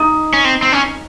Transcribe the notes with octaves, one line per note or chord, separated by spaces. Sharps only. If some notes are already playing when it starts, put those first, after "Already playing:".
Already playing: D#4
C#4
C4
C4
C#4